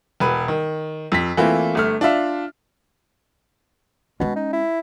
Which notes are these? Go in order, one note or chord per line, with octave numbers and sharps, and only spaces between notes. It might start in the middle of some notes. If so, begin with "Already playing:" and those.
E1 B4
D#3
F2 B6
E3 A3 A#3 C4 E4 F4
G1 A3 F6
D4 F4 E5 F5
B2 G#3 C#4
D#4
E4